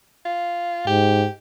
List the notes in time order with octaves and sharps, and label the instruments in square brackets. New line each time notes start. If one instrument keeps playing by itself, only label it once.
[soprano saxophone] F4
[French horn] G#2 [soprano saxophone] G4